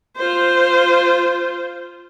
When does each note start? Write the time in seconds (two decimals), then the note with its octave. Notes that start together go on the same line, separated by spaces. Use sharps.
0.17 F4 C5